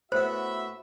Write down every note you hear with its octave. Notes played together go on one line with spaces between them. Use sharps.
A2 B3 F#4 C5 E5 B5